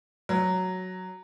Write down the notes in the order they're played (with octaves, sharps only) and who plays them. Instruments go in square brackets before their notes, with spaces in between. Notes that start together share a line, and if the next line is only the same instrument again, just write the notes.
[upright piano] F#3